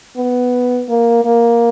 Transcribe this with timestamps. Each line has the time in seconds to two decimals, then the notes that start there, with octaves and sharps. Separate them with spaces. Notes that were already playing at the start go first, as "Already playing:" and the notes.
0.17 B3
0.89 A#3
1.25 A#3